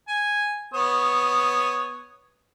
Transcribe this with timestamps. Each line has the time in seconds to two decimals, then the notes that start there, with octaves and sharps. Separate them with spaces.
0.08 G#5
0.74 B3 C#5 D#6